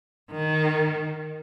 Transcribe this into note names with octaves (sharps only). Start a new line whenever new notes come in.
D#3